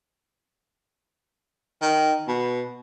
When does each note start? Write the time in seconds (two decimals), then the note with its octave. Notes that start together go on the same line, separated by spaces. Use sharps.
1.82 D#3
2.28 B2